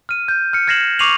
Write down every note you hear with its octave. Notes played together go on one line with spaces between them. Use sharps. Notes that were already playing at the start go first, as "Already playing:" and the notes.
F6 D#7
G6
F6 C#7
F6 G#6 A#6 C7 E7 F#7
C#6 D6 C7 D#7 F7 F#7